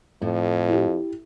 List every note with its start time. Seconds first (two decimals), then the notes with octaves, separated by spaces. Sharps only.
0.22 F2 A2
0.68 E4 G4